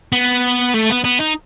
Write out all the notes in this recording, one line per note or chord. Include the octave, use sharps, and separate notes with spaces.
B3
A3
B3
B3
D#4